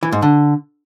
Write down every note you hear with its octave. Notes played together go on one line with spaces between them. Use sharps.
E3
G#2
D3